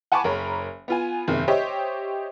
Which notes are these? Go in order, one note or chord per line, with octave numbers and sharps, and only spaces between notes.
F#5 G#5 A5 B5 C#6 D6
F#1 A#4 C#5 B5
B3 F4 G#5
F#1 E2 C3 D#3
G4 C5 C#5 D#5 E5